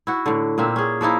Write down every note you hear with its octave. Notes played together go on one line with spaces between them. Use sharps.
E4 F#4
A2 D3
A#2 A#3 C4 E5
C#4 G#4
F3 A#3 D#4 E4